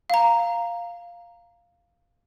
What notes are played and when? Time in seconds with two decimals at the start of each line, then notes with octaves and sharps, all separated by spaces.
0.10 F5 A#5